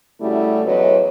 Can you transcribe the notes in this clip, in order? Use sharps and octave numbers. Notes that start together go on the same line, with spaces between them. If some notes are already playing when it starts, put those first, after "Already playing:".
C#3 G3 A3 E4 F#4
E2 F#3 B4 C#5 D#5